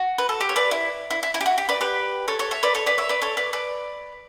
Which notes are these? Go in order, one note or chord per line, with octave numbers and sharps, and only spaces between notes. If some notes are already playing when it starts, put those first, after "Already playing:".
Already playing: F#4
B4
A4
G4
C#5
B4 D5
E4
E4
E4
E4
G4
F#4
G4
B4 D5
G4 B4
A4 C#5
A4 C#5
C#5 E5
B4 D5
A4 C#5
B4 D5
C#5 E5
B4 D5
A4 C#5
B4 D5
B4 D5